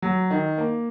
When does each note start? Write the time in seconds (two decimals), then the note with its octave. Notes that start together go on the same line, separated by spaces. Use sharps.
0.02 F#3
0.31 D#3
0.58 A#3